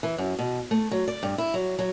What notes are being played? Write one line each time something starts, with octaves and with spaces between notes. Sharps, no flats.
E3
F#2
B2
A3
F#3
D5
G2
E4
F#3
F#3